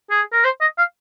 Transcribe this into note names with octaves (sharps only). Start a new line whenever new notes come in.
G#4
A#4
C5
D#5
F5